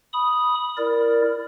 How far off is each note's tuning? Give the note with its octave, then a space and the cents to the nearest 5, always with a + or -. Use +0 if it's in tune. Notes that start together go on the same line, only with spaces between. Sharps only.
B5 -10 D#6 +0
E4 +20 A#4 +0 D5 +0